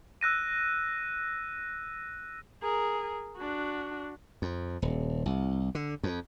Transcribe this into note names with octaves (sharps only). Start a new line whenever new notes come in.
E6 F#6 A#6 D#7
G#4 A#4
D4 F#4
F2
D#1
C2
D3
F2